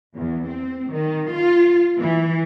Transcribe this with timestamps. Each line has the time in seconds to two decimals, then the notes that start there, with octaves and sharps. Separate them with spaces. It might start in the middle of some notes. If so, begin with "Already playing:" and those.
0.15 E2
0.48 C4
0.91 D#3
1.31 F4
1.98 E3